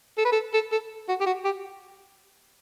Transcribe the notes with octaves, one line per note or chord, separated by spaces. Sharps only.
A4
B4
A4
A4
A4
F#4
G4
F#4
G4